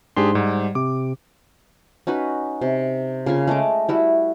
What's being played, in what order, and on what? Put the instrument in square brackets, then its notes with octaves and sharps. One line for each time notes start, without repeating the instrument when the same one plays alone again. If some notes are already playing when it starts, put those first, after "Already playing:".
[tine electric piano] G#2 C6 [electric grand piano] D4 G4 G#4
[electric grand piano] G#2 [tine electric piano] G3
[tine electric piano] C3 [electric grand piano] D6
[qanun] C#4 D#4 F#4 B4
C3
C#3 A#3 F4 G#5
G#3 A3 D#5 D6
G3 E4 F#4